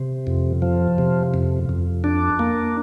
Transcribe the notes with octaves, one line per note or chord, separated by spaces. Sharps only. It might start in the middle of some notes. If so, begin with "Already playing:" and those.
Already playing: C3
F2
F3
C3
F2
F2
D4
A#3